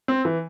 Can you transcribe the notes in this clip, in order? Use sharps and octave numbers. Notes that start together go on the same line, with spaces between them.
C4
E3